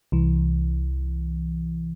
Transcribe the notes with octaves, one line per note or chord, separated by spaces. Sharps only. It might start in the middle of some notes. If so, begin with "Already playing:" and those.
C2 E3